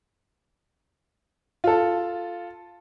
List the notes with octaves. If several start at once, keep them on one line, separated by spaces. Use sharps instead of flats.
F4 A4